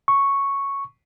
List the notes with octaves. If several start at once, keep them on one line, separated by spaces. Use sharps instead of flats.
C#6